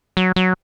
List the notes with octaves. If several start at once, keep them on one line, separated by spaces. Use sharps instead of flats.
F#3
F#3